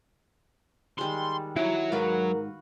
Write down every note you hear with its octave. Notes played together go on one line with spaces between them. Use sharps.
D#3 G3 G#3 C6
F#3 E4
G#2 F#4 A#4 B4 F5